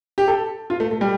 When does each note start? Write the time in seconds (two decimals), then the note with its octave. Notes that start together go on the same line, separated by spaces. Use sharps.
0.18 G4
0.28 A4
0.70 F4
0.80 A3
0.91 A3
1.01 G3